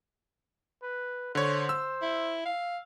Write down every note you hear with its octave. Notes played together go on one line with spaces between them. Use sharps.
B4
D3 C5 C#5
E6
E4
F5